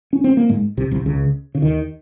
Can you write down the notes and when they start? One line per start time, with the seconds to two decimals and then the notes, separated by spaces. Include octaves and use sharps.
0.13 C#4
0.24 C4
0.37 A#3
0.49 G#2 G#3
0.77 C2 C3
0.91 C2 C3
1.06 C#2 C#3
1.55 C#3
1.62 D#2 D#3